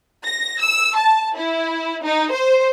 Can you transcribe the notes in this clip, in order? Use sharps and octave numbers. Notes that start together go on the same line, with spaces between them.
A#6
E6
A5
E4
D#4
C5